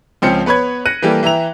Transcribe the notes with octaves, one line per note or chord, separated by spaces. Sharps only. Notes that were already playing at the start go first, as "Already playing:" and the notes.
C#2 F3 C4 C#4 F4 C#7
B3 B4 C#5 B5 G#6
F#6 A#6 C#7 D#7
E3 G3 A#3 G4 A4
E3 E5 G5 A#5 F7